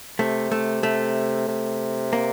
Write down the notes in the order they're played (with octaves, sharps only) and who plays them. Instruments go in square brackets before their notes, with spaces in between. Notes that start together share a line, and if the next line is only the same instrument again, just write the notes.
[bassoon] C3 [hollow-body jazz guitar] A3
[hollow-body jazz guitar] A3
A3
[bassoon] C3
[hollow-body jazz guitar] A#3